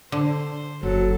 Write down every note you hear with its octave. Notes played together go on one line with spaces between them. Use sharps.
D3 C5
F#1 F#3 A4